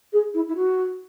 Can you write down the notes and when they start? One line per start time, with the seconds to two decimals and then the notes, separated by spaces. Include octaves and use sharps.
0.13 G#4
0.34 E4
0.49 E4
0.56 F#4